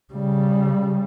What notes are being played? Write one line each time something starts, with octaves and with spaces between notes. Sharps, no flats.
C#3 G3